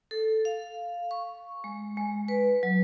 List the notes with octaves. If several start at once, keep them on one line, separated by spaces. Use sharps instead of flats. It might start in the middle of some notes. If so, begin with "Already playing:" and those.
A4
F5
C#6
G#3
G#3
B4
F#3